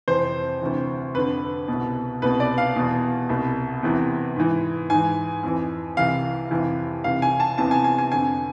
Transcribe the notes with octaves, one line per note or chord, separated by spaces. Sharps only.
F2 C3 E3 C5
D2 C3 E3
F2 D3 B4
C2 B2
C2 B2 B4
D5
F5
E2 B2
C2 B2
E2 C3 E3
G#2 E3
G#2 E3 G#5
F2 E3
C2 C3 E3 F5
F2 C3 E3
C2 C3 E3 F5
G#5
A5
E2 C3 E3 A5
G#5
G#5
G#5
F2 D3 G#5